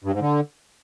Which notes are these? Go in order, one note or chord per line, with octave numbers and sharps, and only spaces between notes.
G2
G#2
D3